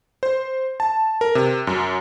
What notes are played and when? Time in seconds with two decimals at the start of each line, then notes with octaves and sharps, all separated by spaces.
0.23 C5
0.80 A5
1.21 A#4
1.35 C3
1.67 F#2